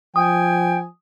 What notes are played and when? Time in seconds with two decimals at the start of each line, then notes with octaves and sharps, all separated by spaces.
0.16 F3 G5 G#5 D#6